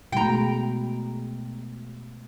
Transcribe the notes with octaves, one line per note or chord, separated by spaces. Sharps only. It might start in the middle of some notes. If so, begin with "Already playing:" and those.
B2 G#3 A3 G5 A#5